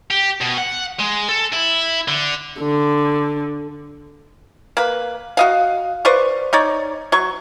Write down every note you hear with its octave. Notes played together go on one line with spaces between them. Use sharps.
G4
B2
F#5
G#3
A4
E4
D3
D3
A#3 B4
F#4 D#5 F5
B4 C5 D5 C#6
D#4 C#5 D5
F#3 C#6